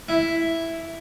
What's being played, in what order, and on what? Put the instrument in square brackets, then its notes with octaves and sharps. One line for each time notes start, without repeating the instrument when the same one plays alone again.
[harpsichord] E4